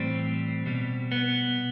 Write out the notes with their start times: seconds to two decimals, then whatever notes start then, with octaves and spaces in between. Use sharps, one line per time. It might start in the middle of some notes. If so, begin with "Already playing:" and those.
Already playing: A2 E3 G3 C4
0.66 B2 G3
1.12 B3